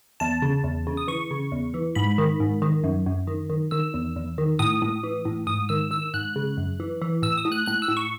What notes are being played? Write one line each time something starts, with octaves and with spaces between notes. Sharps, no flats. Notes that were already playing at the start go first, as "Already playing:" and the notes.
E2 A5
C#3
E2
C#3
D#6
E3 C#6
C#3
E2
E3
G#2 B5
D#3
G#2
D#3
F#2
F#2
D#3
D#3
D#3 E6
E2
E2
D#3
A2 D#6
A2
E3
A2
G#2 D#6
D#3 E6
D#3 E6
G#2 F#6
C#3
F#2
E3
E3
A2 E6
D#6
A2
F#6
A2 F#6
E6
A2
C#6